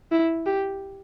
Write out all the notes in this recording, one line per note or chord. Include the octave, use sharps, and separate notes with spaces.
E4
G4